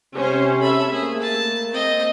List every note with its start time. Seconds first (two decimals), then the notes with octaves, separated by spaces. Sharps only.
0.15 C3 C#4 C5
0.61 A4 E5 B5
0.92 A3 A#3 G#4
1.22 A5
1.72 C4 D#5